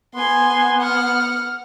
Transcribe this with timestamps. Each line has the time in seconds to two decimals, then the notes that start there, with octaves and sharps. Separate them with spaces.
0.15 B3 G#5 C6
0.82 F#5 F6